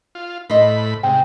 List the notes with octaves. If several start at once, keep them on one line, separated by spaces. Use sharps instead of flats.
F4
A2 C5 D#5 B5
G#2 C3 G5